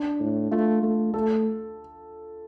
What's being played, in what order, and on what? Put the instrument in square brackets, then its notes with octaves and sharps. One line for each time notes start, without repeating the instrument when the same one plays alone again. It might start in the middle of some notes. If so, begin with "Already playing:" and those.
Already playing: [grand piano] D4
[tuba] A2
[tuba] A3 [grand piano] F4
[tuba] A3
[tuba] A3 [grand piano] A4